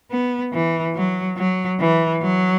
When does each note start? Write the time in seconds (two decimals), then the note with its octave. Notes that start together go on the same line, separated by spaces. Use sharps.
0.11 B3
0.53 E3
0.95 F#3
1.38 F#3
1.80 E3
2.22 F#3